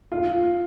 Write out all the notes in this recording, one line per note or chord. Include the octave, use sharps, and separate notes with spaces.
F4